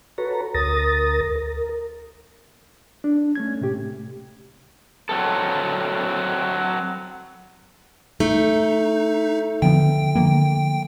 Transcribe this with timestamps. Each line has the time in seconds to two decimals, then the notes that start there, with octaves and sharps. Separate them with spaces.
0.18 F#4 A4 B4 C#5 A#5
0.54 D2 A#4 D#6 A6 A#6
1.36 A#4
3.04 D4
3.35 A3 C#4 G#6
3.61 A2 C3 A3 G4
5.09 F#3 C4 A4
8.20 A3 D#4
9.62 D3 F3 B3 G5
10.15 D3 F3 A#3